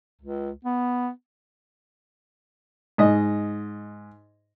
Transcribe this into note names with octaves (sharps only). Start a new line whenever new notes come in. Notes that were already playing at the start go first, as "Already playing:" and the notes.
C#2
B3
G#2 D#5